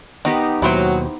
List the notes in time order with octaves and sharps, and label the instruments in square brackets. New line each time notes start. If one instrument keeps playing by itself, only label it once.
[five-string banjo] D#3 [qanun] B3 D#4 G4
[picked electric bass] D#2 B2 [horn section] F#3 [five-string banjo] E4 C5 G5